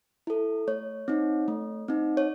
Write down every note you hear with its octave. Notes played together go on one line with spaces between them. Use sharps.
E4 A4
A3 C#5
C4 D#4
A3
C4 D#4
C#5